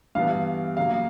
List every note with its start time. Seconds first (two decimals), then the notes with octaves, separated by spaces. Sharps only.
0.15 G2 E3 G3 B3 F5
0.31 F5
0.77 C#3 F#3 A#3 F5